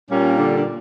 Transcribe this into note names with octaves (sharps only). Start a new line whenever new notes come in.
A#2 G3 A#3 C#4
D3 D4
D4